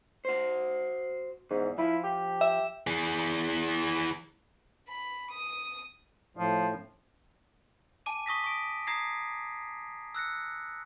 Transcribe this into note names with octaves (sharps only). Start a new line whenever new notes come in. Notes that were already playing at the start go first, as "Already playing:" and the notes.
F#4 C5
E2 G#2
F3 E4
G4
E5
E3 G#4
B5
D#6
A2 F3
G#5 A5 D6 D#7
C#6 D#6 A#6 B6
C#6 D#6 D7
A#5 D#6 G#6 A#6 C7
E6 F#6 A#6 C#7